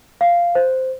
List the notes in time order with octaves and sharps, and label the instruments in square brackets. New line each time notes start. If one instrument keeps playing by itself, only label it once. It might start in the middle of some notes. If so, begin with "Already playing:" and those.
[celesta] F5
C5